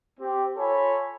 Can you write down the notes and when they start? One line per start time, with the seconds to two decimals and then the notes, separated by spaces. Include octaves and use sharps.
0.20 C4 G4
0.57 F4 A4 C#5 G#5 B5